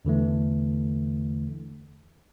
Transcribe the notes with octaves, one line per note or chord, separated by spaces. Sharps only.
E2 D3 E3 A3